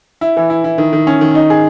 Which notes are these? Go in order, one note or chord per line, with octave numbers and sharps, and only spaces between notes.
E4
E3
E4
E4
D#3
D#3
C#4
D#3
D#4
G#4